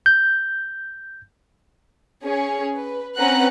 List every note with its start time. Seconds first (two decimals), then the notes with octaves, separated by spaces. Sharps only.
0.06 G6
2.23 C#4 G#4 C#5
2.78 B4
3.18 C4 C#4 B4 F#5 A#5 F#6